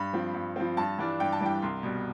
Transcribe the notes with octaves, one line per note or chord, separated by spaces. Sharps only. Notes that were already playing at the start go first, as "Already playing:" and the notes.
Already playing: G2 B5
F3 C4
G2
F3 C4
G2 A5
E3 G3 D4
G2 G5
A5
E3 G3 D4 G5
C2 C6
B2 G3